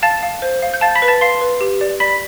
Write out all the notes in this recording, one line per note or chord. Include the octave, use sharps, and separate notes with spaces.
F5 A5 A6
F5
C5
F5
G6
F5 A5 A6
B5 B6
B4
A5 A6
F5 C6 C7
B4
G4
D5
D5 B5 B6